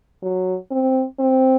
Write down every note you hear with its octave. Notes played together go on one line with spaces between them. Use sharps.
F#3
C4
C4